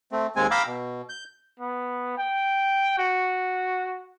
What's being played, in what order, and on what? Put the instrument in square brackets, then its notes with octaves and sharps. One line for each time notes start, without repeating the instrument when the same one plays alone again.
[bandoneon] A3 C4
D#2 G#3 C4 G#5
F5 G5 A#5 B5 D6 E6
B2
G6
[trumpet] B3
G5
F#4